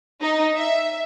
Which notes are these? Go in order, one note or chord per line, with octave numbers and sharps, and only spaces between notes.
D#4
E5